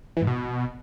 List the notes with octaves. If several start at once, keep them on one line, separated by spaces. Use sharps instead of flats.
E3
G#2
B2